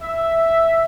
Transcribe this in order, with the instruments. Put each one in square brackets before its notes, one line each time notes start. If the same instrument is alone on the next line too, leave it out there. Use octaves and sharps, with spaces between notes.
[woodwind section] E5